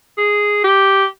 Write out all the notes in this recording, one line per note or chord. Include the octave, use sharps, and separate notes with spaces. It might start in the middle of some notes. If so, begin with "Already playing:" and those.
G#4
G4